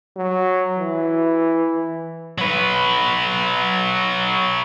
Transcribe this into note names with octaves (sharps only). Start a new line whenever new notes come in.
F#3
E3
F#3 B4